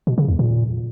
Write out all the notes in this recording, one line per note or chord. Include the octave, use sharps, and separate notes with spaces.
B2
C#3
E2
A#2